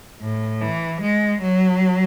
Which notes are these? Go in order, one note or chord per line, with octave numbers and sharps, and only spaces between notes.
A2
E3
G#3
F#3